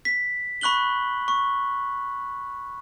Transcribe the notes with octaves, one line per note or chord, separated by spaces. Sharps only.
B6
B5 C#6 F#6 F#7 G7
C#6